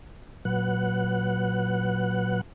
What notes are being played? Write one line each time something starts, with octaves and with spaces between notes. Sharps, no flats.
A#2 F#3 B4 F#5 F#6